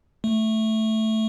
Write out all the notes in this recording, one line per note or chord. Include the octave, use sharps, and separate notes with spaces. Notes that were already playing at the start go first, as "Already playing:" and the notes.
A3